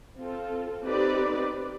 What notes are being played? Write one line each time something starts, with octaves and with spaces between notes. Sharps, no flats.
C4 F4 A4
C4 D#4 G4 B4 D5